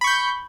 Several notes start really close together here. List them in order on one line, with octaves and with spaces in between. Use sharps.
B5 C#6 G6